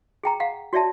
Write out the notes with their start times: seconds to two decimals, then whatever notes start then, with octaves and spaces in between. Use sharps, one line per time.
0.24 G#4 G5 A#5
0.40 F5 F#5
0.73 F#4 C#5 D5 E5 A5